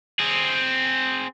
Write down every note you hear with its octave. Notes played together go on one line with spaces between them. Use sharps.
C4 G#4